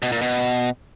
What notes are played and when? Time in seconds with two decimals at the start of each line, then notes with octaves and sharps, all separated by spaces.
0.02 B2
0.12 A#2
0.21 B2